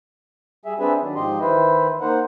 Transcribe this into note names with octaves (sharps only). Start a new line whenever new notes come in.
G3 G#4 E5
C4 D4 G#4 B4 E5
D#3 F#3 D4
G#2 F3 G4 D#5 C6
D#3 E3 E4 B4 C5
A#3 D#4 A#4 C5 F#5